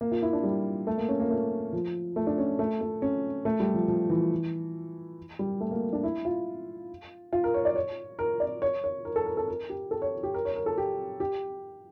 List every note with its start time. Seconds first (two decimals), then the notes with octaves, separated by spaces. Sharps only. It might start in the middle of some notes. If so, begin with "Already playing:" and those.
0.01 A#3
0.12 F4
0.22 E4
0.33 D4
0.44 G3
0.87 A3
0.98 A#3
1.09 C#4
1.20 A#3
1.30 A3
1.73 F3
2.16 A3
2.27 D4
2.38 C#4
2.59 A3
2.81 A3
3.02 C#4
3.45 A3
3.60 G3
3.74 F3
3.88 F3
4.09 E3
5.39 G3
5.61 A3
5.71 A#3
5.93 D4
6.04 E4
6.25 F4
7.33 F4
7.44 A#4
7.54 C#5
7.65 D5
7.76 C#5
8.19 A#4
8.40 D5
8.62 C#5
8.84 C#5
9.05 A#4
9.16 A4
9.26 A#4
9.37 A4
9.48 A#4
9.70 G4
9.91 A4
10.02 C#5
10.23 G4
10.34 A#4
10.45 C#5
10.56 A#4
10.66 A4
10.78 G4
11.20 G4